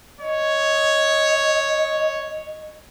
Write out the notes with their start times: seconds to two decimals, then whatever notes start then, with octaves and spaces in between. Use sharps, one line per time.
0.20 C#5 D#5